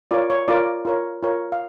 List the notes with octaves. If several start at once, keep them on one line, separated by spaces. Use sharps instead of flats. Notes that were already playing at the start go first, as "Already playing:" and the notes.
F4 A#4 C#5 D5
C#5
F4 A#4 C#5 D5
F4 A#4 C#5
F4 A#4 C#5
F5